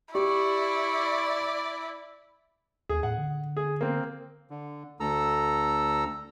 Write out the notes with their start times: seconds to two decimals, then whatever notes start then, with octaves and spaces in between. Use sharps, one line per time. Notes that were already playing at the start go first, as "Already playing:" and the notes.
0.15 E4 G4 D5 C#6
2.89 D#2 G#4
3.03 A2 F#5
3.18 D3
3.57 G#4
3.81 A#3 C4
4.50 D3
5.00 D2 A4 A#5 E6